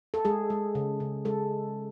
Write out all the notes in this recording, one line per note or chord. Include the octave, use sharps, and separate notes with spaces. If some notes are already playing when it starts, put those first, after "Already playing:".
A4
G#3 G#4
G#3
C#3
C#3
G#3 A4